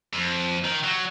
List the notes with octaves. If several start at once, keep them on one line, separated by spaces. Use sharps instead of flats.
F2
D#3
F#3